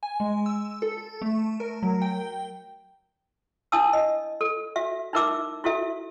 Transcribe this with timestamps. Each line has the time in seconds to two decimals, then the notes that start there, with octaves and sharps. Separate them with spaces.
0.03 G#5
0.20 G#3
0.46 E6
0.82 A4
1.22 A3
1.60 A#4
1.83 F#3
2.02 G5
3.72 D4 E4 F5 A5 D#6 E6
3.93 D#5
4.41 A4
4.76 F#4 E5
5.13 D#4 E4 A#4 E5 D6 E6
5.64 E4 F#4 A4 E5